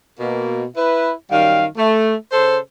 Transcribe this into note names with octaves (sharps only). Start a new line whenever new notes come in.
B2 A#3
E4 B4
F#2 D#3 G3 F5
A3
C#3 A4 C5